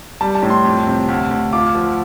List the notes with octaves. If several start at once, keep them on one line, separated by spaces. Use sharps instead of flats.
G3 A5
A5
A2
C6
F2
C3
D2
D2
F4 D6
F3